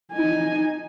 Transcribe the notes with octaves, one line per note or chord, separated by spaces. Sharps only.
D#4 G#5